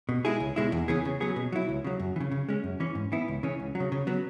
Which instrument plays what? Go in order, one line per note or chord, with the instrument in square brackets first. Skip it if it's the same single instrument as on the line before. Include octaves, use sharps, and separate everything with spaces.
[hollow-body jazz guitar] B2
G#3 E4 G#4
C#2
B2 G#3 E4
E2
C#3 E3 B3 G#4
C#3
F#3 B3 G#4
B2
F#3 E4
C#2
C#3 F#3
F#2
E3
C#3
C#3
G#3 C#4
F#2
E3 C#4
G#2
E3 B3 E4
C#2
C#3 E3 C#4
C#2
F#3
C#3
C#3
F#3 B3